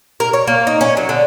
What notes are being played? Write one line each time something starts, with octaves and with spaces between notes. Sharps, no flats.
A#4
C#5
A#3
D#4
C#4
F#3
D3